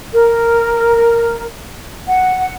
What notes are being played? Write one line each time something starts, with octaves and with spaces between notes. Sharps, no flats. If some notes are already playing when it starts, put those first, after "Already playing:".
A#4
F#5